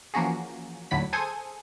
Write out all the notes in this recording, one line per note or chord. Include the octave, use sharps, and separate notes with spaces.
E3 F3 A#3 C#4 F#4 G#4
D#2 A2 D3 F#3 B5 B6
G#4 A4 C5 G#5 C6 D#6